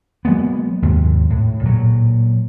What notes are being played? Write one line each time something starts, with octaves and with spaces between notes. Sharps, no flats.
F#3 G#3 A#3 B3
D#2 G#2 C3
A2
A#2 F#3